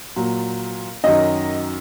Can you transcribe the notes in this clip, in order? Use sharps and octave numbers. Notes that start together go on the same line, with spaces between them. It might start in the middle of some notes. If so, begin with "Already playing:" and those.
A#2 F#3
F#2 D#3 F#3 D#5